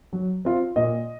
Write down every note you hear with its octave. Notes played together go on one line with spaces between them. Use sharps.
F#3
C4 F4
A#2 D#5